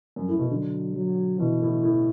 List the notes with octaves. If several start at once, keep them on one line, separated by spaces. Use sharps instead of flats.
F#2
A2
B2
D3 F#3
F#3
B2 E3
A2
A2